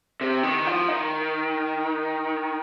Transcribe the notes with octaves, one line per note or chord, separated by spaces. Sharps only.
C3
D#3
F3
D#3